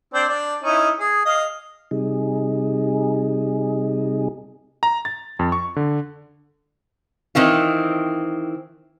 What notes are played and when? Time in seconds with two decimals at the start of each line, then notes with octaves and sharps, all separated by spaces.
0.14 C4 D4 C5
0.29 D4
0.63 C#4 D#4 E4
1.00 G#4
1.26 D#5 F5 D#6
1.91 C3 G3 D#4 G#4
4.83 A#5
5.05 A6
5.39 F2
5.52 C#6
5.76 D3
7.35 D#3 E3 C4 F4